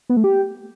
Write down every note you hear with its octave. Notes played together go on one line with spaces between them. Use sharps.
B3
A3
G4